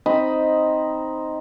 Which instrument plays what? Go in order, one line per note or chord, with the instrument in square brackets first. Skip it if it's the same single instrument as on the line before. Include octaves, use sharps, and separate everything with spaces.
[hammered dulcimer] C4 D#4 D#5 B5